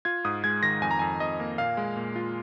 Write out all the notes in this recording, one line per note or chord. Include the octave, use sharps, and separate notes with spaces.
F4 G#6
G#2 D#6
G#3 G#6
D#3 A#6
F2 G#5
A#5
F2 G#5
F2 D#5
A#3
A#2 F5
G#3
A#2
F4